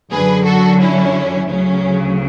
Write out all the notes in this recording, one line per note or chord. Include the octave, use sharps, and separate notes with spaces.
F#2 D3 F#3 G#4 B4
F#4 A4
C#4 E4
D2 C#3 F#3 C#4